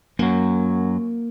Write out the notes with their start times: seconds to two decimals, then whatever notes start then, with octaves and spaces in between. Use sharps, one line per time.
0.19 F#2 F#3 A#3